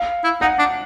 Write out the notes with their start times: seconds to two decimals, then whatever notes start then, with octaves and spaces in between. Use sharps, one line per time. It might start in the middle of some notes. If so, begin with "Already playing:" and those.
Already playing: F5
0.24 E4
0.41 D#4 F#5
0.59 D4